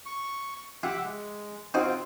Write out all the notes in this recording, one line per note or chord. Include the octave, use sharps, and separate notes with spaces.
C#6
F4 G4 E5 F#5
G#3
C4 D#4 F4 F#4 C5